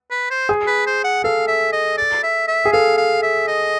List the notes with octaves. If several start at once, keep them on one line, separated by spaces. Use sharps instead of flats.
B4
C5
G#4
B4
C5
F#5
A4 F5
E5
D#5
D5
E5
E5
G#4
A4 F5
F5
E5
D#5